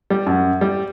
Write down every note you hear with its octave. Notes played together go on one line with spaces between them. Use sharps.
G3
F#2
G3